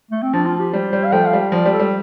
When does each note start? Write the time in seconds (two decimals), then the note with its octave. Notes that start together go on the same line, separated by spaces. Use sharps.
0.11 A3
0.22 C4
0.33 F3 D4
0.46 F4
0.60 G4
0.73 G3 C5
0.93 G3
1.05 F5
1.12 F3 A3 G5
1.26 F5
1.33 G3
1.52 F3 D5
1.66 G3
1.72 A4
1.79 G3